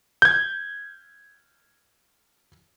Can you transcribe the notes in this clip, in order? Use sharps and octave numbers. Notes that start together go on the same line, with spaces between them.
G6 G#6